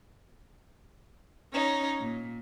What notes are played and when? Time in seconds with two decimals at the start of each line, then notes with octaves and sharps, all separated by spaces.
1.52 C#4 D#4 C#5
2.00 A#2